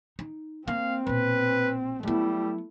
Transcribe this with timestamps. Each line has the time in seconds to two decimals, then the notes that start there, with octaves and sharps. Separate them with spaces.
0.19 D#4
0.68 A#3 C4 F5
1.07 A#1 B2 B4
2.03 F#3 G3 A3 B3 E4